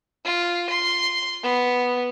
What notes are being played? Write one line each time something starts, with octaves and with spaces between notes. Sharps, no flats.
F4
C6
B3